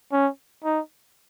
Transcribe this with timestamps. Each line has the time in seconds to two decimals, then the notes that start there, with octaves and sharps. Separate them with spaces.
0.13 C#4
0.64 D#4